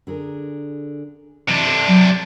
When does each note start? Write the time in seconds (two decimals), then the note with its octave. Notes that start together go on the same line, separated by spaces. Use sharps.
0.07 D3 G#4 A#4
1.49 C3 E3 D4 E5 A5
1.66 A4 D5
1.88 F#3